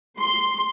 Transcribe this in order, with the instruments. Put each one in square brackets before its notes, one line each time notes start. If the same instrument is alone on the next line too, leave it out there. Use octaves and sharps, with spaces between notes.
[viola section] C6